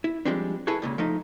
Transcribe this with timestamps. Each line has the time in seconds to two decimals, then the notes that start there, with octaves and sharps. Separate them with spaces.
0.04 E4
0.25 F3 G3 G#3 C4 D4
0.67 E4 G#4 A4 B4 C#5
0.82 C#2 A#2 C#3
0.98 F3 A3 D#4